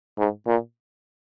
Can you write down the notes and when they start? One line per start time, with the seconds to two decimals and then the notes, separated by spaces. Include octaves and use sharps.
0.18 G#2
0.47 A#2